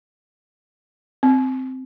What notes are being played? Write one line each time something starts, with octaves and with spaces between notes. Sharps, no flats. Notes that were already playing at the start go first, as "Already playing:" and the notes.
C4